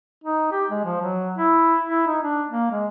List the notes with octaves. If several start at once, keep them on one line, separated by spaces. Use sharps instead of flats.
D#4
G4
G#3
F3
F#3
E4
E4
D#4
D4
A#3
G#3